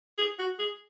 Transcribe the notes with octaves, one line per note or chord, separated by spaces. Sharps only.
G#4
F#4
G#4